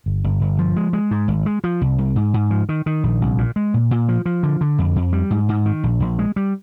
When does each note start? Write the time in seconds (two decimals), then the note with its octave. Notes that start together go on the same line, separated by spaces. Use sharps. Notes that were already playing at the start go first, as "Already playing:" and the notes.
0.06 G1
0.24 G1
0.41 G1
0.59 F3
0.76 G#3
0.93 G#3
1.11 G#2
1.28 G#1
1.46 G#3
1.64 F3
1.81 C2
1.98 C2
2.16 G#2
2.34 G#2
2.51 F3
2.69 D#3
2.86 D#3
3.04 A#1
3.22 C2
3.38 A#2
3.56 G#3
3.74 A#2
3.91 A#2
4.09 F3
4.26 F3
4.43 D3
4.61 D3
4.78 F2
4.96 F2
5.13 G3
5.31 G#2
5.49 G#2
5.66 D#3
5.84 A#1
6.00 A#1
6.19 G#3
6.36 G3